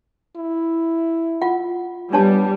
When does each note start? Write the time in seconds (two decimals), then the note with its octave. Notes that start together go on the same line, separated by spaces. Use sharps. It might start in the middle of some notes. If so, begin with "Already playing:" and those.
0.37 E4
1.42 F4 F#5
2.13 G3 B3 D4 C#5 A5